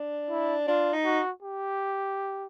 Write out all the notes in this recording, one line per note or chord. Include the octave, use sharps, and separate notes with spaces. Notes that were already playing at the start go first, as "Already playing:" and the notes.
Already playing: D4
E4
D4 F4
D#4
F#4
G4